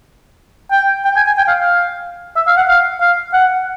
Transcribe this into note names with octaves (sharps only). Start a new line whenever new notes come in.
G5
G5
G#5
G#5
G5
F5
F5
E5
F5
F#5
F5
F5
F#5